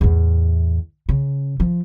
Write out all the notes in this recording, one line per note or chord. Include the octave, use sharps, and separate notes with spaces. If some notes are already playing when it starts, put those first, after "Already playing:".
E2 A2
C#3
F3